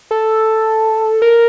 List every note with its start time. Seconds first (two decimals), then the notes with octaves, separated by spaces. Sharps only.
0.11 A4
1.22 A#4